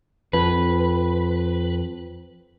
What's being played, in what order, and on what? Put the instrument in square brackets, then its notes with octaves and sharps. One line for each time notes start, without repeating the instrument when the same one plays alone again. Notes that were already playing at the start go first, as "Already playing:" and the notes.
[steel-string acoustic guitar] F2 [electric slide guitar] B4